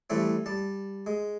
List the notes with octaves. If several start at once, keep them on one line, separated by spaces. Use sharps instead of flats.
E3 G3 A3 C4
G3 A5
G#3